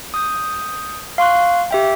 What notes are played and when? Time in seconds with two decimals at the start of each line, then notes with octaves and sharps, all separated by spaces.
0.14 D#6 G6
1.18 F5 C6 C#6 F#6
1.71 G4 E5 G5